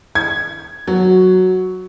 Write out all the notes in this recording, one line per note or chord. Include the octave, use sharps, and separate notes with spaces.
G#6
F#3